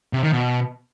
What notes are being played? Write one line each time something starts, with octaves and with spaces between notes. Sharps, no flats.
C3
D#3
B2